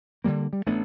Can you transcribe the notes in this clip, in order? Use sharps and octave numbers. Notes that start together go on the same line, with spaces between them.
D3 F3 G3 A#3
G3
A1 A3 B3 D4